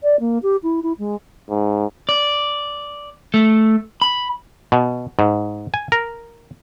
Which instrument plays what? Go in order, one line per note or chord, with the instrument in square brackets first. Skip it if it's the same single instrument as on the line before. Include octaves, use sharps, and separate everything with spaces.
[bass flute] D5
A#3
G4
E4
E4
G#3
[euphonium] G#2
[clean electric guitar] D5
A3
B5
[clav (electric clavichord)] B2
G#2
G#5
A#4